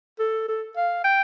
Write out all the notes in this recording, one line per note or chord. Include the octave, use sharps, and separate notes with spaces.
A4
A4
F5
G5